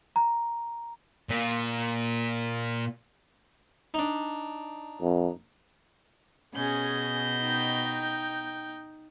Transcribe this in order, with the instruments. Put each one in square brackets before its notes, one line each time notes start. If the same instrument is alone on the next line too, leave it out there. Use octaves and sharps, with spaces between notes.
[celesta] A#5
[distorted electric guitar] A#2 A#3
[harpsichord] D4 D#4
[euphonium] F2
[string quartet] B2 G6 A#6 [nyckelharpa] C#4 G#4
[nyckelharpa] D#4 G5